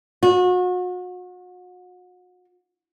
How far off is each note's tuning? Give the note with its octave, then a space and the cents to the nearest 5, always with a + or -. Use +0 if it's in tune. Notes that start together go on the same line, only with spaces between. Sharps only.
F#4 -35